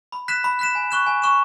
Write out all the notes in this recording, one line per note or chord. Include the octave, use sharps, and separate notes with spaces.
B5
F#6 B6 E7
B5
F#6 B6 E7
G#5
C#6 F#6 E7
G#5
C#6 F#6 E7